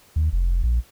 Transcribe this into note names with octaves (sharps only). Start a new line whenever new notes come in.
D#2
F1
A#1